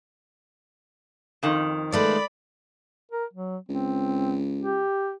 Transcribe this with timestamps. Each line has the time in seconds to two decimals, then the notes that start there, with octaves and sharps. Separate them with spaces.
1.43 F2 D#3
1.92 G#3 A3 B3 D5 B5
3.12 A#4
3.33 F#3
3.69 C#2 C4
4.61 G4